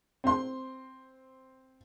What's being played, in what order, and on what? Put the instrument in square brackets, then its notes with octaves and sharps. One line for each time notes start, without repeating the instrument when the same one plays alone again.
[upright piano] C4 C6